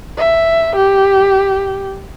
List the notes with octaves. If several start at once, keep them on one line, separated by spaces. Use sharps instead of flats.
E5
G4